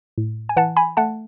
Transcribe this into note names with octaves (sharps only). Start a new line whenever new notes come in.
A2
G#5
E3 F#5 A5
G#5 B5
A3 F#5 A5